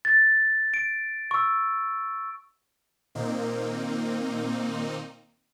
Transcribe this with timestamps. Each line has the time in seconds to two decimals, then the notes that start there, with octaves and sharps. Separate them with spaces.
0.05 A6
0.74 D7
1.31 C#6 E6
3.15 A#2 D#3 A#3 C4 D#4